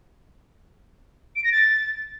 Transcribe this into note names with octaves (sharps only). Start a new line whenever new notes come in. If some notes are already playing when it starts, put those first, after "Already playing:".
D7
A#6
A6